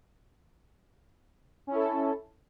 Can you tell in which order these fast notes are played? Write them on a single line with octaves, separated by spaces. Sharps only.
C#4 E4 A4